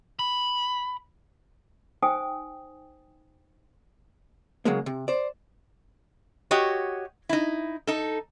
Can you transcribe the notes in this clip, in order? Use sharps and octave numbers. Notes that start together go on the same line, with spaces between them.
B5
D#4 C5 G5 G#5 D#6
C#3 F#3 G#3 A#3
C3
C5 D5
F#4 G4 C#5 D#5
D#4 E4
D#4 A4